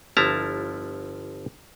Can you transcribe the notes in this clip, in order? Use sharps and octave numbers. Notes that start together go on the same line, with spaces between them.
G1 F3 E4 A5 A#5